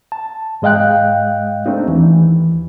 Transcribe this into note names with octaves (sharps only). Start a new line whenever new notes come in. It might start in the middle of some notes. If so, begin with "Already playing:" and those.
A5
G#2 G#3 D#5 F5 G5 F#6
A3 C4 D4 D#4
D#2 E3